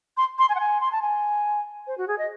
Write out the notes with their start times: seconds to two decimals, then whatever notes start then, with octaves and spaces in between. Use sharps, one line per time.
0.17 C6
0.39 C6
0.49 G#5
0.55 F#5
0.60 G#5
0.80 C6
0.92 A5
1.02 G#5
1.87 C5
1.98 F#4
2.08 G#4
2.18 D#5